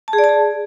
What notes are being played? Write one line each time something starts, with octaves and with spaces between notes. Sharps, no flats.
A5
G#4
D5
A5
G#4